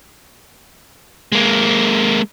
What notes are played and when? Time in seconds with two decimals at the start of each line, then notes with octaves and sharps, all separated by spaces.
1.32 G#3 A#3